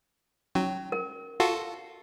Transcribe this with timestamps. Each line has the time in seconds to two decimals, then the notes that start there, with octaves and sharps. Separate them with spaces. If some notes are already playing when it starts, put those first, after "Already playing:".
0.55 F#3 C#4
0.92 A#4
1.40 F4 F#4 A4